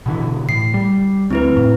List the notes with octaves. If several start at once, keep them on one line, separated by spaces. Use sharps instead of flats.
B2 D3 E3
A2 C7
G3
D2 C4 E4 B4
F2 A2